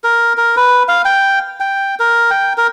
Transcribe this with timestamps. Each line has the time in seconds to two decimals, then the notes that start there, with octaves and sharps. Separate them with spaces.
0.04 A#4
0.37 A#4
0.56 B4
0.88 F5
1.05 G5
1.60 G5
1.99 A#4
2.30 G5
2.58 A#4